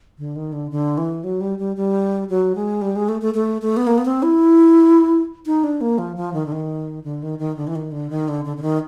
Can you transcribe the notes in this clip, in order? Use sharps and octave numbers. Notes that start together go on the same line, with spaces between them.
D3
D#3
D3
D3
E3
F#3
G3
G3
G3
F#3
G#3
G3
G#3
A3
A3
A3
A3
B3
A#3
B3
C4
E4
D#4
D4
A#3
F3
F3
D#3
D3
D#3
D3
D#3
D#3
D3
E3
D#3
D3
D#3
D3
D3
D3
D#3